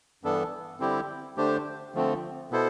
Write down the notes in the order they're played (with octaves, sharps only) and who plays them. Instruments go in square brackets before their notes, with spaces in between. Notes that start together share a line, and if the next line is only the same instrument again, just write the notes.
[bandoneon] G2 E3 B3 D4 A4
D3 G3 C4 E4 G4
D3 A3 D4 G4 C5
D3 F3 A3 C4
B2 B3 E4 A4 C5